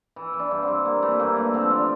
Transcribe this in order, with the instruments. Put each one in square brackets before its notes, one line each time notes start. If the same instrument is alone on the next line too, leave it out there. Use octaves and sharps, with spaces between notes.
[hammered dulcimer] E3
E3
D4
G2
C4
G2
E3 A#3
E3 A3
G2 A#3
G2 A3
F3 C4
F3 D4